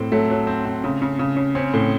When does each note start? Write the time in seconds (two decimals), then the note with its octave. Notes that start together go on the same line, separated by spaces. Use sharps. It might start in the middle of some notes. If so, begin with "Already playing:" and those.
Already playing: A2 C4
0.12 F#3 A3
0.30 F#3
0.47 C4
0.65 C4
0.84 C#3
1.02 C#3
1.19 C#3
1.37 C#3
1.55 C4 C#4
1.74 A2